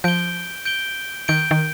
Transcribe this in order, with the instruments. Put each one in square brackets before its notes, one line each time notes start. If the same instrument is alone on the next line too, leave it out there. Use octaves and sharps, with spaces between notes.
[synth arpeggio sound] F3 [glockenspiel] G6 D7 G7
[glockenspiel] G6 D7 G7
[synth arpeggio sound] D#3 [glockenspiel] G6 D7 G7
[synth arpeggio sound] D#3